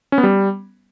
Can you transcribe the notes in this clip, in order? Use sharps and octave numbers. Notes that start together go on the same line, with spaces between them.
C#4
B3
G3